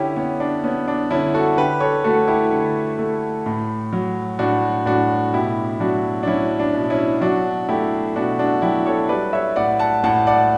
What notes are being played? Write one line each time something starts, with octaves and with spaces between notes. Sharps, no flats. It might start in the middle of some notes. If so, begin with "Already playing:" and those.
Already playing: D3 C#4 E4 G4
B3 C#4
D4
B3 C#4
D4
D3 C#4 E4
F#4 A4
D3 G4 B4
A4 C#5
A3 F#4 A4
E4 G4
D3
A3
A2
F#3
A2 D4 F#4
A2 D4 F#4
B2 E4 G4
F#3 D4 F#4
D4
F#3 C#4 E4
D4
B2
C#4 E4
F#3 D4 F#4
A3 E4 G4
B2 D4 F#4
D4 F#4
F#3 E4 G4
A4 C#5
G3 B4 D5
C#5 E5
A2 D5 F#5
F#5 A5
A2 F#5 A5
D5 F#5